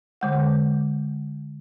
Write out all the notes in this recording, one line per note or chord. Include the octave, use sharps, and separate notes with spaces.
D3 G#3 F#5